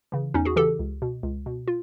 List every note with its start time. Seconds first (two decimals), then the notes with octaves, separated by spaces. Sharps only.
0.12 C#3 E3
0.34 E2 C#4 D#4
0.45 F#4 G#4
0.56 C#3 E3 G4 A4
0.79 C#2
1.02 B2
1.23 C#2
1.46 B2
1.68 F4